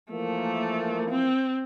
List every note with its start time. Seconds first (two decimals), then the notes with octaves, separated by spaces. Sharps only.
0.12 E3 F3 A3 A#3
1.10 C4